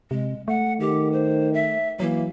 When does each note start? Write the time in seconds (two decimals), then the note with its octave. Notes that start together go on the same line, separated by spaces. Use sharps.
0.11 C3 G#3
0.48 A3 F#5
0.80 D#3 G4
1.12 C5
1.54 E5
2.00 E3 F#3 A#3